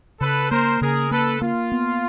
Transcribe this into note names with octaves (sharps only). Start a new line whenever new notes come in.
C#3 A4 B4
A#3 A#4 C5
C#3 G#4 A#4
A#3 A4 B4
A#3 F4
B3